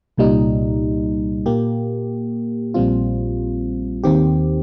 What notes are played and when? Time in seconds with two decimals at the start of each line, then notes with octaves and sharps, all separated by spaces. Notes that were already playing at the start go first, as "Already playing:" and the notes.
0.18 C2 A#2 G3 D#4
1.46 A#2 A#3 G4
2.74 A#1 A#2 G3 C4 F4
4.04 D#2 D#3 C4 G4